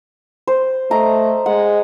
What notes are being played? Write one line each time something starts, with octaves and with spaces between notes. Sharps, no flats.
C5
A3 D#5 A#5
G#3 F#5